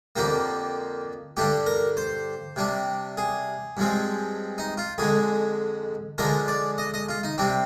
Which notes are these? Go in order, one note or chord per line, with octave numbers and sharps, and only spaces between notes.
F2 D3 F3 A#3 G4
G2 D3 G3 D4 G4
A#4
C5
C3 G3 D4
G#4
G2 F3 G#3 C4
D#4
F4
F2 D3 G#3 G#4
D3 F3 G#3 D4 A#4
D5
D#5
D#5
F4
D#4
C3 G3 C4 D4